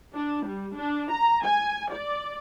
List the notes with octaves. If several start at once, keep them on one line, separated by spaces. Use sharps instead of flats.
D4
G3
D4
A#5
G#5
D5